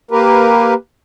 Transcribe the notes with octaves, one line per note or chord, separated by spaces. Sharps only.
A#3 G4 A#4 B4